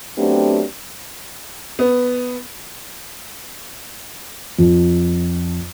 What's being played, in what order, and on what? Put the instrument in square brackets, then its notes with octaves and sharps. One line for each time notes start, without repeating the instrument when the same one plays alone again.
[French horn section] F#3 A3 B3 C4 D4 G4
[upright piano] B3
[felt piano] F2